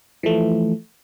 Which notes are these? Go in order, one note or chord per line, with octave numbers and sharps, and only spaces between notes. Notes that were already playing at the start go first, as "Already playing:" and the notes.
E3 F3 A3